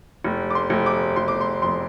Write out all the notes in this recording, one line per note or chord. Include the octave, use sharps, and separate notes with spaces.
F1
D6
C6
F1
D6
F1 C6
D6
C6
F2 C6